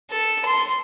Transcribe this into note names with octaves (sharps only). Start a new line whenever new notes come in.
A4
C6